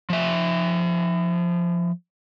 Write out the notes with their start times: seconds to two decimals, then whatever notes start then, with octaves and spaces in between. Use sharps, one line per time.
0.10 F3 E5